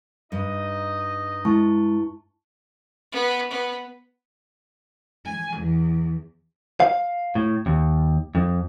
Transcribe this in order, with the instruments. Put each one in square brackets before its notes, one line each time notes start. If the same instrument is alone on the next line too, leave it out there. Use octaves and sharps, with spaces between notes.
[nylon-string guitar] G2 [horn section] D#4 D#5
[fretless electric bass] G#3 [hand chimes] E4 A5 C#6
[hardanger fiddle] B3
B3
[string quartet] G#5
E2
[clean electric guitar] F5
A2
D#2
F2